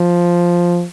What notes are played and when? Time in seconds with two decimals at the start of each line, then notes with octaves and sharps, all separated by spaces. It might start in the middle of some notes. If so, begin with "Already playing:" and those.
Already playing: F3